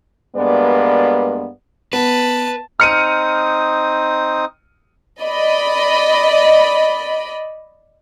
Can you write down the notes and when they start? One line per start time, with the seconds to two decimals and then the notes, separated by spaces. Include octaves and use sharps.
0.36 G2 G#3 A#3 B3 B4 D5
1.93 B3 B4 A5
2.80 C4 D#4 D#6 F6 C#7 D#7
5.21 D5 D#5 B5